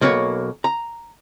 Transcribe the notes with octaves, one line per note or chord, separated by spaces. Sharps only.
B1 A#3 F#4 B4 C#5
A#5